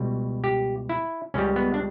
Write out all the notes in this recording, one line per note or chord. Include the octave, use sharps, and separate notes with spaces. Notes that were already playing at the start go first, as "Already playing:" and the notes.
Already playing: C#2 B2 G3
G4
E4
C#2 C#3 G3 C#4
B3
D4